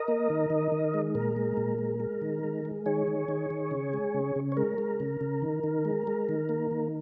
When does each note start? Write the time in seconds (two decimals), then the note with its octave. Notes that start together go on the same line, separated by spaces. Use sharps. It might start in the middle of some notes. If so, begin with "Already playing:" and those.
Already playing: A#4 D#5
0.08 A#3
0.30 D#3
0.50 D#3
0.72 D#3
0.94 G#3
1.15 A#2 A#4
1.36 G#3
1.57 A#2
1.78 G#3
2.00 G#3
2.22 D#3
2.43 G#3
2.65 G#3
2.86 D#3 G#4 C#5
3.07 D#3
3.28 D#3
3.50 D#3
3.71 C#3
3.93 G#3
4.14 C#3
4.36 C#3
4.52 C#5
4.57 G#3 A#4
4.78 G#3
5.00 C#3
5.21 C#3
5.42 D#3
5.63 D#3
5.85 G#3
6.07 G#3
6.29 D#3
6.49 A#3
6.71 D#3